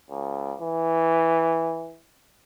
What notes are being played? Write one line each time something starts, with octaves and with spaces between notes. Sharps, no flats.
C#2
E3